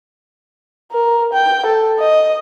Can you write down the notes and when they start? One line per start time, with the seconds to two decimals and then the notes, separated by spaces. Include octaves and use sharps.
0.92 A#4
1.33 G5
1.66 A4
1.99 D#5